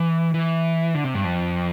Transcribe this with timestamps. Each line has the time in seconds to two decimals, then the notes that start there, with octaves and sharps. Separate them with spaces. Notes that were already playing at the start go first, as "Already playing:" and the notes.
Already playing: E3
0.34 E3
0.95 D3
1.04 C3
1.14 G2
1.24 F2